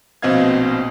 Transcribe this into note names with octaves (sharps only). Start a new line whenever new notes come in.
A#1 B2 C4 D#5 F5 G#6